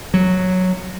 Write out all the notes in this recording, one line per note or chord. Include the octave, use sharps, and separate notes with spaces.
F#3